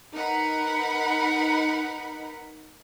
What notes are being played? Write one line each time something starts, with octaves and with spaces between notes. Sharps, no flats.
D#4 A#4 B4 F#5 B5